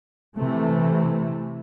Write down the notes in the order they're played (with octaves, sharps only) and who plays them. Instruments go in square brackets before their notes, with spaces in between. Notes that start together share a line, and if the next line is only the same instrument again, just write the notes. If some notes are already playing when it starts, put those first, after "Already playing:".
[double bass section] C3 E3 A3